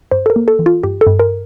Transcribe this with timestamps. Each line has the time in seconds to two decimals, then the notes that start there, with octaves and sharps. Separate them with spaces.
0.11 G2 C5
0.26 A4
0.30 A#4
0.36 A#3
0.48 A4
0.59 E3
0.66 F4
0.83 G2 G4
1.01 A4
1.07 G2
1.20 A#4